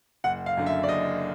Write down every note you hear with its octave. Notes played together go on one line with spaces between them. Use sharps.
F#1 F#5
F5
F#2 D3
E5
D5
F#1 D#5